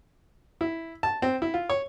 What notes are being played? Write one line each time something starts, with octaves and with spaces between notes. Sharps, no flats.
E4
A5
C4
E4
F4
C#5